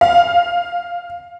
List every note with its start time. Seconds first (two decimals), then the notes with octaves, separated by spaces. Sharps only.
0.01 F5